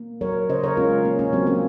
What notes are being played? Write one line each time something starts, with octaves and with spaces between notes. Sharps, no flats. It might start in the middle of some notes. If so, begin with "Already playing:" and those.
Already playing: A#3
F#3 A#4 C#5
C#3 C5 D#5
A#4 C#5
G#3 C#4 F4
A#3 C#4
A#3 C#4
F#3 C4
A#3 C#4